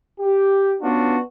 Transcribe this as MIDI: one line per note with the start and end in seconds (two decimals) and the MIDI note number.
0.19 0.73 67
0.81 1.17 59
0.81 1.17 61
0.81 1.17 62
0.81 1.17 65
0.81 1.17 66